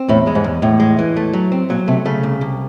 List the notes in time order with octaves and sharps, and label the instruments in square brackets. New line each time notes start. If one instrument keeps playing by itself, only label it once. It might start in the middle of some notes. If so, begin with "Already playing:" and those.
Already playing: [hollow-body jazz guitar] C4
[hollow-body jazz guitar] E2 [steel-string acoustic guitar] A2
[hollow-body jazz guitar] G#3
[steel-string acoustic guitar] G#2
[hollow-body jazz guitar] E2
[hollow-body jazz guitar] E2 [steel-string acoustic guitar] A2
[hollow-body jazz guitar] G#3
E3
A3
F#3
C4
[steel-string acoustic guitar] A#2 [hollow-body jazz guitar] F#3
[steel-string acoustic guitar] C3 [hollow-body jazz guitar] A3
[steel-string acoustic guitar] C#3 [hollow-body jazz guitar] A3
[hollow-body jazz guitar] C2
C2